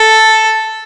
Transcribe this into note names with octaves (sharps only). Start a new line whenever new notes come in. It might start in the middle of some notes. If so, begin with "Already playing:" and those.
Already playing: A4